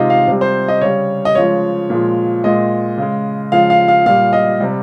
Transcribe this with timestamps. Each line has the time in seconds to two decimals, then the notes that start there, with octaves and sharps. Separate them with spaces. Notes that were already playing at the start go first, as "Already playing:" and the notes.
Already playing: C3 D#3 G#3 F4 D#5
0.10 F5
0.28 C3 G3
0.41 C5
0.68 D#5
0.81 C#3 G3 C#5
1.25 D#5
1.35 C#3 F3 G#3 C#5
1.90 A#2 F3 G#3
2.44 A#2 G#3 D#5
2.98 C#3 G#3
3.52 C#3 F3 G#3 F5
3.70 F5
3.88 F5
4.06 A#2 G3 F5
4.33 D#5
4.60 C3 G3